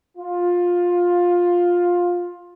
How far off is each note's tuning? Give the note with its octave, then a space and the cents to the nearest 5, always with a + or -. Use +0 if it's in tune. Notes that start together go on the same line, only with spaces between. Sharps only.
F4 +15